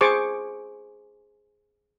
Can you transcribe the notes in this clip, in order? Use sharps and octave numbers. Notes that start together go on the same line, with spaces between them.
G#4 C5 C#6 D6